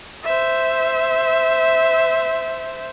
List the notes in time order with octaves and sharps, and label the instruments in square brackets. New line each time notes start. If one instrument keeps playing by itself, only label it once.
[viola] C5 E5